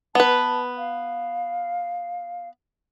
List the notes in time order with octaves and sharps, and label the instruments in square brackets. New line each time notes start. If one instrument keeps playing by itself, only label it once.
[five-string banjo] B3 B4 [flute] A5
[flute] F5